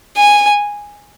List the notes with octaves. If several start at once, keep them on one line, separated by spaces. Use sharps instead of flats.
G#5